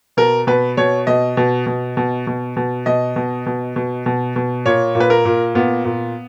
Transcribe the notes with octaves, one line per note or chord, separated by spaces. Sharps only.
B2 A#4
B2 B4
B2 C#5
B2 D#5
B2
B2
B2
B2
B2
B2 D#5
B2
B2
B2
B2
B2
A#2 C#5
A#2
B4
A#4
A#2
A#2 B3
A#2